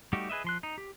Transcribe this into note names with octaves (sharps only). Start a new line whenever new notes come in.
G3 A3 D#4 F#4 G4
G#4 B4 D#5 E5
F3 C6 F#6
D#4
G4